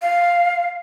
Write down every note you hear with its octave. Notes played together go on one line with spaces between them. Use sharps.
F5